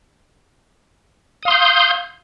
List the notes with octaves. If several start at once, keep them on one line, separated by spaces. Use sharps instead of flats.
F5 C6 D#6 G6